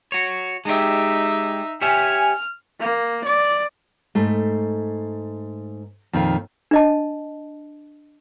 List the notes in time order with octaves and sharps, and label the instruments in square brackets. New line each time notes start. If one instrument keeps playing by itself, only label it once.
[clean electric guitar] F#4 C#5
[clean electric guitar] G#3 G4 [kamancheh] D#4 E5
[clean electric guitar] G4 C#5 E5 [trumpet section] G#5 [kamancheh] F6
[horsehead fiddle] A#3
D5
[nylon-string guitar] G#2 A3
F2 A#2 D#3
[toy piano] D4 D#5 A5